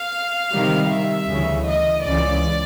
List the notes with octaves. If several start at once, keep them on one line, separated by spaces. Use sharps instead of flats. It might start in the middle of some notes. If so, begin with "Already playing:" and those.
Already playing: F5
C3 D#3 G3
E5
D2 C#3 E3
D#5
C#2 C#3 E3 D5